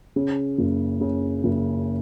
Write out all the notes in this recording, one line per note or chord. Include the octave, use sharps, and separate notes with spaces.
C#3
F#1
C#3
F#1